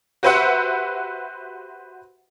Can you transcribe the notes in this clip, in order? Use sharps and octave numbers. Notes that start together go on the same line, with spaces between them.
F#4 G4 B4 C5 E5 F#5